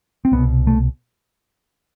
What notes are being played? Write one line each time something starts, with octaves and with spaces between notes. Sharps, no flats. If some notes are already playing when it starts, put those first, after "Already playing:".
C4
C2 B2 B3
A3